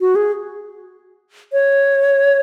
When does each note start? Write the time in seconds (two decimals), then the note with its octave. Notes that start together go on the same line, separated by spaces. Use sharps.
0.01 F#4
0.15 G#4
1.53 C#5